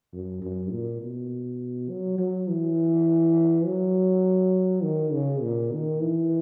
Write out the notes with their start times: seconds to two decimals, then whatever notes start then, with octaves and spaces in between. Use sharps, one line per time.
0.13 F#2
0.42 F#2
0.72 A#2
1.02 B2
1.89 F#3
2.18 F#3
2.49 E3
3.66 F#3
4.83 D#3
5.13 C#3
5.42 A#2
5.72 D#3
6.02 E3